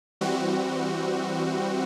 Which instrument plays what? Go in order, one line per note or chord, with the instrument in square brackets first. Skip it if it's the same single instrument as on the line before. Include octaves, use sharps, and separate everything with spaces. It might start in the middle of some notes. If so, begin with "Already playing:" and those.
[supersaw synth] E3 G3 C4 F#4